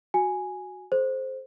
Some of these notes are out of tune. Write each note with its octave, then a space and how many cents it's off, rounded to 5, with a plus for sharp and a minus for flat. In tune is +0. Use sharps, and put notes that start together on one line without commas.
F#4 -5 G#5 +0
A4 -45 C5 +0